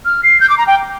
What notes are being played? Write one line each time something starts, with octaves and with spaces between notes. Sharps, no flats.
F6
C7
G6
D6
A#5
G5